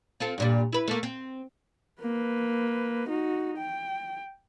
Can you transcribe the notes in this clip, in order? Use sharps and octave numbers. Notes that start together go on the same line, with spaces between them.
C4 F4 A4
G2 A#2 G3
E4 B4
A3 A#3
C4
A#3 B4
D#4 F#4
G5